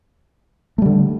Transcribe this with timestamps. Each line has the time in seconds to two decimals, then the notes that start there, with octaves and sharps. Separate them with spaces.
0.78 A3
0.82 G3
0.86 D3